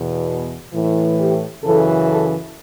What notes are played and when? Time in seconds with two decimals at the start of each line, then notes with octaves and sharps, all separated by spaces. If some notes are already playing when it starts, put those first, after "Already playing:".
Already playing: E2 B2
0.73 A2 E3
1.18 G4
1.63 F#2 C#3 E3 A4
2.08 A4